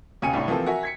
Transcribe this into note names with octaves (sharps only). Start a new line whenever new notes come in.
E1 D#2 C#3 G#5 C#7 D#7
C2 A2 D4
E3 F3 A#3 C4 A4
F#4 A#4 E5 G#5
G#6 B6 C#7